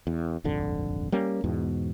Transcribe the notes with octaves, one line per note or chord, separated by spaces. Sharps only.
E2
D#1 G#1 F2 D3
G3 A#3 C#4
E2 G#2 B2